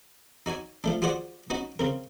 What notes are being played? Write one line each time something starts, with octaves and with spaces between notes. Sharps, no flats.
D#4 F#4 C#5 G#5
F3 A3 D4
F4 F#4 G#4 C5 D5 F#5
B3 C#4 D#4 F#4
C#3 C4 A#4